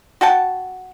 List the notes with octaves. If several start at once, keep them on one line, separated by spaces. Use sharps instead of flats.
F#4 F#5 G5 A5